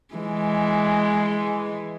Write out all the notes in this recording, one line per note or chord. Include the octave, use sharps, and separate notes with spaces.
E3 G#3